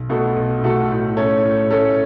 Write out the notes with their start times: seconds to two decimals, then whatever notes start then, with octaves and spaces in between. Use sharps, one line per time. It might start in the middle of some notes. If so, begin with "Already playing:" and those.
Already playing: B1
0.09 B2 A3 F#4 A4
0.36 B1
0.63 B2 A3 F#4 A4
0.91 A2
1.17 A3 C#4 A4 C#5
1.43 A2
1.70 A3 C#4 A4 C#5